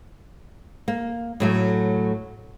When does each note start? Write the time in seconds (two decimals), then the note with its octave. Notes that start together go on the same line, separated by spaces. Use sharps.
0.88 A#3
1.40 A2 F#3 A3